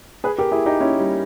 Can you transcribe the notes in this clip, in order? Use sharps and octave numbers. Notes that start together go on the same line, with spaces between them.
G#4 B4
G4 A#4
E4 G#4
D#4 G4
C#4 E4
G3